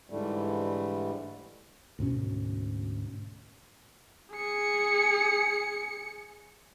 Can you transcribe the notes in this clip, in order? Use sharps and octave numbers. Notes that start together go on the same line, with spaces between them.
G#2 D3 E3 G3 A3
D2 G#2 B2 C#4
G#4 C#7